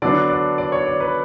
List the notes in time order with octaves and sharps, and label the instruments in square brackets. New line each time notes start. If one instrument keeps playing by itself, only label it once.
[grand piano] D3 F#3 B3 D4 D5
D5
D5
C#5
D5
B4